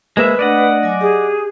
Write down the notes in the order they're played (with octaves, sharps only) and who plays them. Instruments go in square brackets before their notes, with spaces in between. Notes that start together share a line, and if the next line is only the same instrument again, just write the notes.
[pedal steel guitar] G#3 A#3 E5 [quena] B4 [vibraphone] C5
[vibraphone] A3 D4 [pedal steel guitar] D5 D#5 F#5
[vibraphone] F#3 G#5 D6
[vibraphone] G4 [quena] G#4